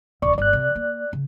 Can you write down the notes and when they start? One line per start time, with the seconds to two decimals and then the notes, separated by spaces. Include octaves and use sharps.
0.22 D#1 C2 D5 C#6
0.38 G1 E2 D5 F#6
0.53 C3
0.75 A#3
1.13 C#3